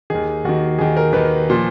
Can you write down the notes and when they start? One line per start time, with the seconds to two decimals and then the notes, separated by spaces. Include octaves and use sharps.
0.10 D#2 D#3 G#4
0.45 D#2 D#3 F#4
0.78 D#2 D#3 G#4
0.97 A#4
1.13 D#2 D#3 B4
1.50 A#2 F3